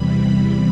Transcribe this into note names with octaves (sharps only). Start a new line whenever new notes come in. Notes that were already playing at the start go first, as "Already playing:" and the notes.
Already playing: E2 C3 E3 G3 B5